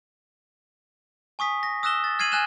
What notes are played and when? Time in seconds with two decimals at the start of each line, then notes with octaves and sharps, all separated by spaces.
1.39 G#5 C#6 D#6 B6
1.63 A#6
1.83 D#6 E6 F#6 A#6 E7 G7
2.04 A6
2.19 F6 G#6 C7 D#7 F#7
2.32 G#5 F6 F#6 A#6 E7 G7